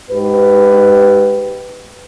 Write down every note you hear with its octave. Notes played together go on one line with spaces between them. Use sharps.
G#2 G4 B4